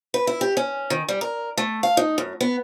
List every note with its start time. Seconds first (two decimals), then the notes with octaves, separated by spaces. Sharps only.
0.14 B4
0.27 E4
0.41 G4
0.57 C#4
0.90 D#3
1.08 G3
1.21 A#4
1.57 A3
1.83 F5
1.97 D#4
2.18 F#2
2.41 B3